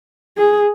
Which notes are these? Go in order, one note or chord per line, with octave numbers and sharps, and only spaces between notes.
G#4